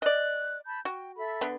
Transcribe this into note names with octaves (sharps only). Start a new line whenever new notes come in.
D5 D#5 F#6
A5 B5 G6
F#4 G5
A4 E5 B5
D3 B3